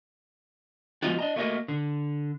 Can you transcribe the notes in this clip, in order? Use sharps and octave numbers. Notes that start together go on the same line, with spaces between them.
F3 G#3 B3 D#4 F4 F#4
D4 D#5 A#5
A3 A#3 F#4 A#4 C5 D#5
D3